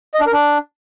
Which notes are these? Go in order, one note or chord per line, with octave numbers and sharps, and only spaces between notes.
D#5
D4
A#4
D4